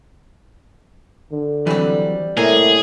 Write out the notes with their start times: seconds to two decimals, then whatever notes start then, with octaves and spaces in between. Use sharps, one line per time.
1.32 D3
1.67 E3 F#3 G3 C4 G4
2.37 A2 C3 A#3 G#4